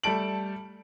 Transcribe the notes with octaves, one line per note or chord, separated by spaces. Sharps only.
G3 A3 A5 D7 F#7